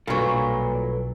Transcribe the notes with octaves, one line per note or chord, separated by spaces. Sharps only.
B1 G2 A#2 F#3 A4 B4